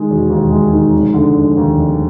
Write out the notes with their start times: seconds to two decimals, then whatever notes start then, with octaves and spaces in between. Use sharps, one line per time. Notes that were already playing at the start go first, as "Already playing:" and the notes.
Already playing: D#3 G#3
0.09 E1
0.30 D#2
0.51 G#3
0.73 D#3
0.94 F1
1.14 D3
1.35 F1
1.57 D#2
1.77 F1